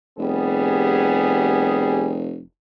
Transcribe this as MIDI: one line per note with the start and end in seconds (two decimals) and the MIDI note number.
0.19 2.42 29
0.19 2.24 55
0.19 2.24 59
0.19 2.24 68